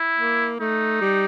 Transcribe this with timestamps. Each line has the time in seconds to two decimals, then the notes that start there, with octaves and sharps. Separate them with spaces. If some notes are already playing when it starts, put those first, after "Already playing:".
Already playing: E4
0.19 A#3
0.60 A3 D#4
1.01 G3